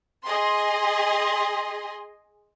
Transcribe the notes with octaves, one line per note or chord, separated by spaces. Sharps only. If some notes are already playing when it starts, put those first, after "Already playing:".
G#4 D#5 C6